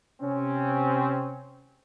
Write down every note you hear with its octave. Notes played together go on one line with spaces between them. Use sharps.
C3 C4 C#4